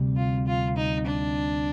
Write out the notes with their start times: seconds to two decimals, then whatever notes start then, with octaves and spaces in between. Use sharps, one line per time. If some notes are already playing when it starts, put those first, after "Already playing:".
Already playing: D2 C3 G3 C4
0.16 F4
0.47 F4
0.77 D#4
1.06 D4